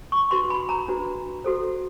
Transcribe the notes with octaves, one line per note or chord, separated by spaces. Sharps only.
C#6
D4 F#4 B4 C6
B5
A#5
D4 F#4 B4
F#4 A4 C5